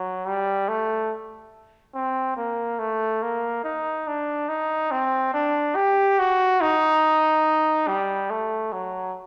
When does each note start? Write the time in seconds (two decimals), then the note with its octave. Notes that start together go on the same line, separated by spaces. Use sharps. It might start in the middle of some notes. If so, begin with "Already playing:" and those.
Already playing: F#3
0.26 G3
0.69 A3
1.95 C4
2.37 A#3
2.79 A3
3.23 A#3
3.64 D#4
4.07 D4
4.49 D#4
4.91 C4
5.34 D4
5.76 G4
6.19 F#4
6.61 D#4
7.88 G3
8.30 A3
8.72 F#3